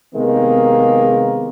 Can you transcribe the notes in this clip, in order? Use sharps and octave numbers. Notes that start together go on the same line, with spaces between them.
C3 D#3 G#3 A#3 B3